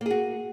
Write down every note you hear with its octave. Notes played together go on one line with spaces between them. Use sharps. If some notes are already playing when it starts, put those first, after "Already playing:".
A#3 F#4 G#4